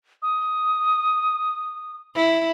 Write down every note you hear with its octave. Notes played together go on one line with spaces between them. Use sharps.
D#6
E4